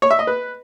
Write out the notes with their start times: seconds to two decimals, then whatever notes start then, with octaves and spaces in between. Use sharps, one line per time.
0.02 C#5
0.11 E5
0.19 D#5
0.27 B4